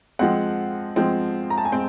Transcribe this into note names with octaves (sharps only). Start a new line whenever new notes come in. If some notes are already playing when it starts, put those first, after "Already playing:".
F3 G#3 C4 F#5
F3 G#3 C4
A#5
A5
G#5
G#3 C4 G5